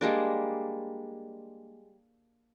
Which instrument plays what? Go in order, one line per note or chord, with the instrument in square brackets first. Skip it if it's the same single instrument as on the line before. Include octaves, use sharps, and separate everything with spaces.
[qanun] G3 G#3 A#3 D4